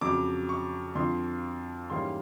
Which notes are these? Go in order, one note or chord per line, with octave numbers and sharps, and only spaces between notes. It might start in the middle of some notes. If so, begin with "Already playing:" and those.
F2 C#3 F#3 D6
C#6
F2 D3 F3 C6
G#2 E3 G3 A#3 C#4 C6